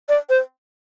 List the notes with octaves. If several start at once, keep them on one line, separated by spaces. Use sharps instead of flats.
D5
C5